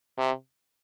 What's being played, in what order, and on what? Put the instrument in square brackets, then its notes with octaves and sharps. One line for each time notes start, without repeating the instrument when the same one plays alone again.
[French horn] C3